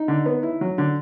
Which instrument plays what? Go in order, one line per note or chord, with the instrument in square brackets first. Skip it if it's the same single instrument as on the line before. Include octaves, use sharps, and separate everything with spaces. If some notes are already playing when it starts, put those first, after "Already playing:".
Already playing: [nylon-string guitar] D#4
[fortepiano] D3
B3
E4
F#3
D3